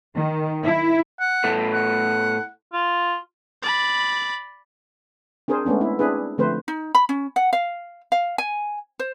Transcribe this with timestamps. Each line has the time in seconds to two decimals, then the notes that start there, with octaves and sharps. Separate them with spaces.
0.15 D#3
0.63 E4
1.20 F#5
1.44 A2 A3 B3
1.74 F#5
2.73 F4
3.63 D5 B5
5.48 C4 D4 G#4 A#4 C5
5.65 G#3 A3 B3 C#4 D4
5.80 C4 E4
5.99 C4 D4 E4 G#4 B4
6.38 D3 F3 A3 C4 B4 C5
6.68 D#4
6.95 B5
7.09 C#4
7.36 F#5
7.53 F5
8.12 F5
8.38 G#5
8.99 C5